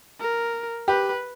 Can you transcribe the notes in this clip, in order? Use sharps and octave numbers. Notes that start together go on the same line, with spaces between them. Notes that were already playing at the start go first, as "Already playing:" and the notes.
A#4
G4 B4